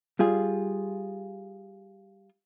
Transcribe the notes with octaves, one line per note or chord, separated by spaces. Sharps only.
G3 F4 G#4